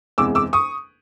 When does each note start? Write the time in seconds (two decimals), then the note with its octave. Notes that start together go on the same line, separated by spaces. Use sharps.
0.18 F#1 E2 C3 E3 G#3 D6 E6
0.35 D6 E6
0.53 C#6 D#6